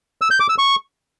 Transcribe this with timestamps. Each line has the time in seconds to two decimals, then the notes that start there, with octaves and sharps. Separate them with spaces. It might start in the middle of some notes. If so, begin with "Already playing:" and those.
0.22 E6
0.31 G6
0.40 D6
0.49 E6
0.58 C#6